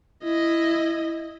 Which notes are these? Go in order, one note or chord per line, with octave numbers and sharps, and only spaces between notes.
E4 D#5